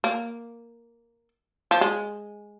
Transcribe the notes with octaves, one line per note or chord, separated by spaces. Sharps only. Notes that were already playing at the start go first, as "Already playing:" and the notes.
A#3
F3
G#3